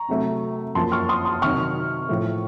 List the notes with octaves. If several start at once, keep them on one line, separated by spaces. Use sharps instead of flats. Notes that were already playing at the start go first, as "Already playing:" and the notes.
Already playing: A#5 C#6
C3 F#3 A3
F#2 F3 A#3 A5 C6
C#6 F6
C6 D#6
C6 D#6
C3 D#3 F#3 C#6 F6
A2 F3 A3